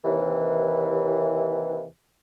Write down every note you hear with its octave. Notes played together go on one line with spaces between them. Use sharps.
D#2 C3 E3